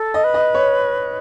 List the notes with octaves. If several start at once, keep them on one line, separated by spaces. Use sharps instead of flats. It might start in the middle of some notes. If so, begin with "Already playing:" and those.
Already playing: A4
D#5
B4
D#5
C#5